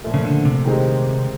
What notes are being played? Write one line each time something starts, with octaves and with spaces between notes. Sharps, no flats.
A#2 F3 A3
C#3
D3
C3
D#3 G#3 C4 D#4 G4